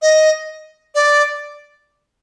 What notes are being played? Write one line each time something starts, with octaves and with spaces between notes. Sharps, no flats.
D#5
D5